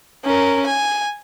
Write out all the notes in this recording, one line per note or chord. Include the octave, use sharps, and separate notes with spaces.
C#4 A#4
G#5